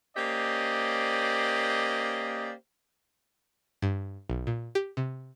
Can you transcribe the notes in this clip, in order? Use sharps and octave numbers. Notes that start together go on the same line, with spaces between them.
A#3 C#4 G4 C5 D5 D#5
G2
B1
A#2
G4
C3